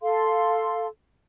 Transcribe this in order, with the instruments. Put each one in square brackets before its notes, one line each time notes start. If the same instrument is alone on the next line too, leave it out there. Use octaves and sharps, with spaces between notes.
[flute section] A4 F5 C6